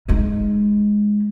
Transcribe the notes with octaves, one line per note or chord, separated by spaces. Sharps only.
G#3 D#4